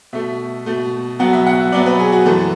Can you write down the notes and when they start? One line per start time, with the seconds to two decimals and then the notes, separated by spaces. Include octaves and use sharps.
0.13 B2 A3 E5
0.66 B2 A3
1.19 B2 F#3 B3 F#5
1.33 E5
1.47 F#5
1.60 E5
1.72 B2 F#3 B3 D5
1.86 B4
1.99 G#4
2.12 F#4
2.26 F#2 E3 A3 A4